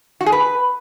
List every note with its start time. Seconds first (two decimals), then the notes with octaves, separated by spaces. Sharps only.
0.21 F#4
0.26 G#4
0.32 B4